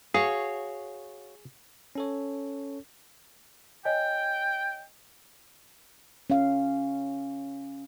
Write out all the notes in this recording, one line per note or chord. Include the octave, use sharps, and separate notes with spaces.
F#4 G#4 C#5 F5
C#4 A4 C#5
C#5 D#5 G5 G#5
C#4 F5